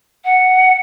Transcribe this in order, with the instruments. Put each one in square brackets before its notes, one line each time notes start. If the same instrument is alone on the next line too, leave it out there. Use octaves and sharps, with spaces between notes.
[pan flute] F#5